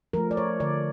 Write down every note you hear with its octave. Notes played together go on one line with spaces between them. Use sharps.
F3 A3 A#4
D5
C#5
D3 D5